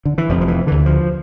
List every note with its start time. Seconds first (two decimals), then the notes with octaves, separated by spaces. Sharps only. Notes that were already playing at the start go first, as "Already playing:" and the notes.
0.05 D3
0.18 E3
0.29 F1 F2 C3 F3
0.41 F3
0.48 E3
0.67 D2 D3 E3
0.86 F3